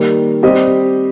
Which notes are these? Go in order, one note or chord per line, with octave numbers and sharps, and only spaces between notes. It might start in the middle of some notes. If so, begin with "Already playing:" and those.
Already playing: D#3 G3 A#3
G3 C4 G4 C5 D#5